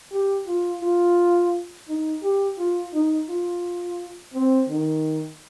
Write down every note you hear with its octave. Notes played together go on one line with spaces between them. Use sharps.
G4
F4
F4
D#4
G4
F4
D#4
F4
C4
D#3